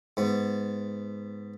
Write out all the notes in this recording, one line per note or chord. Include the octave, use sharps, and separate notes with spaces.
G#2 B3